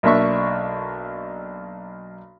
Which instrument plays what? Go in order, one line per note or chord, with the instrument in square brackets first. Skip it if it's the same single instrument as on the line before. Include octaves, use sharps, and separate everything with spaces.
[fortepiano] B1 A#3 D4 E5 C#6